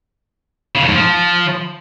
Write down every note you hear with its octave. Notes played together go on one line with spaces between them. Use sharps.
C#3
F2
G#2
F3